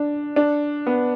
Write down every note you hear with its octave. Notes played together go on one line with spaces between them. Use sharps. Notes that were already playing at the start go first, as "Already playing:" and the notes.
Already playing: D4
D4
B3